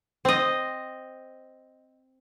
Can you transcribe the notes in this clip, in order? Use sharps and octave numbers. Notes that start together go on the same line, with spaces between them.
C4 D#5